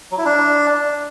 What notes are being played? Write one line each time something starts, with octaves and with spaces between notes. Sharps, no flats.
F#3
E4
D4